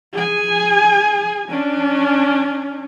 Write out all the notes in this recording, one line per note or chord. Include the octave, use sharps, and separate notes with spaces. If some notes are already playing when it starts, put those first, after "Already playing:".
G#4 G#5
C#4 D4